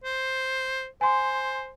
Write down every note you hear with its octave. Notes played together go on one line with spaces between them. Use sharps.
C5
C5 G#5 C6